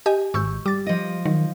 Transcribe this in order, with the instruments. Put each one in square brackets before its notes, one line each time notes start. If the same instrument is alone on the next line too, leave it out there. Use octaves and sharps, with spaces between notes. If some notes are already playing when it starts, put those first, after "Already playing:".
[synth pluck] G4 D#5 G#5
[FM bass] G#1 [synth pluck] C#6 E6 G6
[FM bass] G3 [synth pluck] D6 A6
[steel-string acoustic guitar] F3 D#5
[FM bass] D#3 [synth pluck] F#3